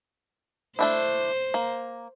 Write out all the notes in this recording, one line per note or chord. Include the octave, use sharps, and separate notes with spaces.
A3 D4 E4 C5
A#3